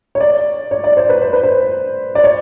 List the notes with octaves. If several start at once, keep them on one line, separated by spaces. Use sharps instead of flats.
C#5
D5
C#5
D5
C5
B4
C5
B4
C5
D5
C#5